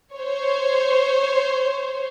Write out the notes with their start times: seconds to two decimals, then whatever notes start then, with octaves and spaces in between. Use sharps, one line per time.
0.16 C5 C#5